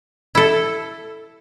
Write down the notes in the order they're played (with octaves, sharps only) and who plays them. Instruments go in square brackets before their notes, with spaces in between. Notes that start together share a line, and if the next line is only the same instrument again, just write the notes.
[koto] E4 A4